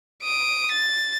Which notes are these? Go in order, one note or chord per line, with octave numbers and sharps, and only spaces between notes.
D#6 D7
A6